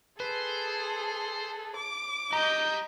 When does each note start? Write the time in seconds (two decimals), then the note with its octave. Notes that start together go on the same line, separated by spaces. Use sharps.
0.20 G#4 A4 B4 C5
1.76 D6
2.33 G4 D#5 A#5 B5 G6